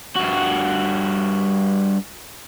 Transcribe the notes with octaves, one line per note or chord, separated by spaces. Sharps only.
G2 F#4